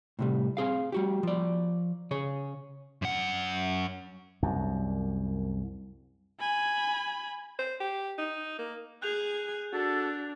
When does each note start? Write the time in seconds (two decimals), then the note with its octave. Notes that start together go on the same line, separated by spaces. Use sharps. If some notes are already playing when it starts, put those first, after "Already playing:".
0.19 A2 C3 G3
0.57 C4 G#4 F5
0.92 G3 F#4 G4
1.23 F3 D5
2.11 C#3 G#4 C#5
3.02 F#2 F#5
4.43 C2 F#2
6.40 G#5 B5
7.59 C5
7.80 G4
8.18 D#4
8.59 A#3
9.02 G#4 G#5 F#6 G6 F7
9.73 D4 F#4 A4